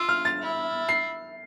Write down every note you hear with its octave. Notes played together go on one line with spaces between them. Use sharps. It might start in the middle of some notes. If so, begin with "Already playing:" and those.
Already playing: F4 E6
F6
A6
E4
C7